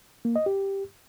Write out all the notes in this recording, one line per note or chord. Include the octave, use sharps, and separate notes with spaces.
A#3
D#5
G4